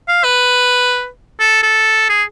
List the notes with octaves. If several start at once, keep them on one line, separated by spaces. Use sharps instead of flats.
F5
B4
A4
A4
G#4